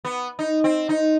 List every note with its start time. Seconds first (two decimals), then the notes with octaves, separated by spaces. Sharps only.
0.05 B3
0.39 D#4
0.64 C4
0.89 D#4